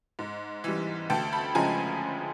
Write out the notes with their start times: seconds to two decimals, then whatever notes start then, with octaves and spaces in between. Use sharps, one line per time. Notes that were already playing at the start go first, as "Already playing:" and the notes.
0.19 G#2
0.64 E3 G3
1.10 D2 G5 A5
1.33 A5 B5
1.55 C#3 F3 G#3 G#5 A#5